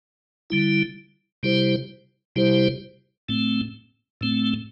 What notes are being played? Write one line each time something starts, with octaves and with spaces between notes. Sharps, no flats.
D3 G3 E4
C3 G3 E4 G4 C5
C3 G3 E4 G4 C5
A2 A3 C4
A2 A3 C4